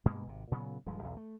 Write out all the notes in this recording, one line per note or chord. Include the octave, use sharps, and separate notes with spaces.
G2 B2 G#3 A#3
G#1 C3
A#2 C#3 F#3 B3
D#1 G2 F3 G#3
B1 E2
A3